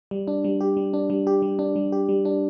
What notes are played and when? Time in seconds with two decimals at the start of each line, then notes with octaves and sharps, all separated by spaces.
0.11 G3
0.27 D4
0.44 G3
0.61 G4
0.77 G3
0.93 D4
1.10 G3
1.27 G4
1.42 G3
1.59 D4
1.76 G3
1.92 G4
2.09 G3
2.25 D4